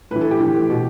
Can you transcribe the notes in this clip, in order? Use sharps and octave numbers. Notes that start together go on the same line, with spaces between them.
A2 E3 B4
A4
G4
A2 E3
B2